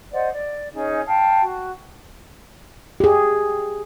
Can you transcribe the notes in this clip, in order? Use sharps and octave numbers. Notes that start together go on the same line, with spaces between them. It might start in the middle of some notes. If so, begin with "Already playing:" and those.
C5 D5 D#5 F#5
D5
C#4 D#4 G#4
F5 G5 A5
F#4
G4 G#4